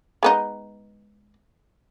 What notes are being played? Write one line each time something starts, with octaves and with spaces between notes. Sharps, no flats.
G#3 B3 D#4